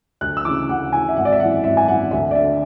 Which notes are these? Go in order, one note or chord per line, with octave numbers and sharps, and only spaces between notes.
D2 F#6
E6
C#3 E3 D6
D2 F#5
C#3 E3 G#5
E5
G#1 F#5
D5
E5
F#2 E3 F#5
G#1 E5
G#5
F#2 E3 F#5
D2 E5
D5
D3 E5